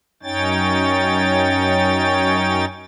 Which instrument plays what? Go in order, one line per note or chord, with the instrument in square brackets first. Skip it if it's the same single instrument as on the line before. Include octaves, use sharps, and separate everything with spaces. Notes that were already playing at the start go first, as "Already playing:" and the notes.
[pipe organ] F#2 C#4 D#4 C#5 G5 A6